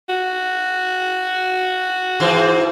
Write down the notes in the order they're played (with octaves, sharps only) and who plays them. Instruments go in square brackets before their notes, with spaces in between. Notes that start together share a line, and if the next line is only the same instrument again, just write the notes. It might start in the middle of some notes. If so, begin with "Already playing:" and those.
[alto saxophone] F#4
[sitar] G#2 E3 C4